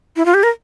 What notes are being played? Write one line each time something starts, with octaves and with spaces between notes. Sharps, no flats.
E4
F4
G4
A#4